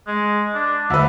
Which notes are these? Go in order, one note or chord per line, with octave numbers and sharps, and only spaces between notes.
G#3
D4
D2 B4 E5